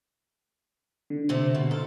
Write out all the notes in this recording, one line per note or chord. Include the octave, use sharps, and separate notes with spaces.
D3
C3 A3
B2
D#4 F4 A4